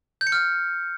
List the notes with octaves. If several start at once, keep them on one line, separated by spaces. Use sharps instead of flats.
G6
C#7
F6